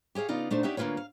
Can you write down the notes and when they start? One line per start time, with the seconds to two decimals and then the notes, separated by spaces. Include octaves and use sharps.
0.15 G4 G#4 C#5 F5
0.28 C#3 B3 D#4 F4 D5 F5
0.50 A#2 A3 D4 D#4 C5 A5
0.63 C#4 D#4 G4 D5 E5 F#5
0.77 D2 A#3 C#4 F4 B4 C#5
0.97 F5